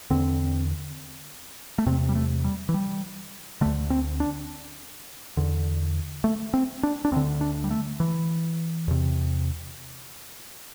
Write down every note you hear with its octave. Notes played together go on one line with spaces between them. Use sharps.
E2 D3 C4
A3
E2 C3 C4
G3
A3
G3
E3
G3
D2 D3 A3
C4
D4
E2 D3
A3
C4
D4
D4
D2 D3 C4
D4
G3
A3
E3
E2 C3